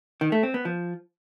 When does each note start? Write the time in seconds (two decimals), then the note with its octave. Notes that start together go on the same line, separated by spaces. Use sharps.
0.21 D#3
0.32 A3
0.43 C4
0.54 B3
0.65 F3